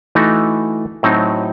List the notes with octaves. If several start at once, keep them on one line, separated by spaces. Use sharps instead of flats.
E3 A3 D#4 F#4
A2 F#3 C4 D#4